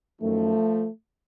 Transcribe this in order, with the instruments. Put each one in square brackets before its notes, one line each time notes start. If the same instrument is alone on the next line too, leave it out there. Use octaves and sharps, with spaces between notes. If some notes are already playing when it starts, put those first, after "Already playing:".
[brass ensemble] F#2 D#3 F3 A3